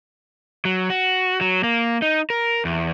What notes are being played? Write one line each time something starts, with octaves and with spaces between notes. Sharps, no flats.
F#3
F#4
F#3
A#3
D#4
A#4
E2